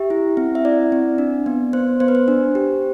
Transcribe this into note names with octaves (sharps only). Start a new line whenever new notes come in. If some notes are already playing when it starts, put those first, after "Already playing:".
Already playing: G4 E5
E4
C4
E5
E4 D5
C4
D4
B3
B3 C5
B3 C5
B4
C5
D4
G4